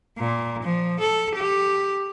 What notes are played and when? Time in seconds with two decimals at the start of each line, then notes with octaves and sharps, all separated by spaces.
0.18 A#2
0.64 F3
1.00 A4
1.37 G4